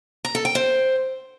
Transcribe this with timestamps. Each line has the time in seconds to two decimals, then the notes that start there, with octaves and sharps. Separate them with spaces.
0.25 A#5
0.35 A4
0.45 G5
0.55 C5